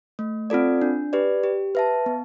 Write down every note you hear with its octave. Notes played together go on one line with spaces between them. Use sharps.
A3
C4 F4 A4 D5
D4
G4 B4 D5
G4
B4 E5 A5
B3